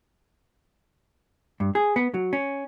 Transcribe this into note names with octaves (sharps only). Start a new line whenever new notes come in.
G2
G#4
B3
F#3
C#4